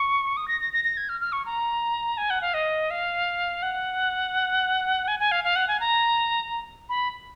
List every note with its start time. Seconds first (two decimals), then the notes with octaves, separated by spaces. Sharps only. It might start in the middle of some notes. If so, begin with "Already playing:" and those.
Already playing: C#6
0.37 D#6
0.48 A#6
0.61 A#6
0.73 A#6
0.84 A#6
0.97 G#6
1.09 F6
1.21 F6
1.32 C#6
1.46 A#5
2.17 G#5
2.30 F#5
2.41 F5
2.54 D#5
2.91 F5
3.63 F#5
5.08 G#5
5.20 G#5
5.32 F5
5.44 F5
5.56 F#5
5.68 G#5
5.80 A#5
6.89 B5